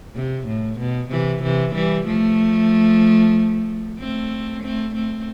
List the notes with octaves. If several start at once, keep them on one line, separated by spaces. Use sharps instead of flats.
C3
A2
B2
C3 E3
C3 E3
E3 G3
F3 A3
A3 C4
A3 C4
A3 C4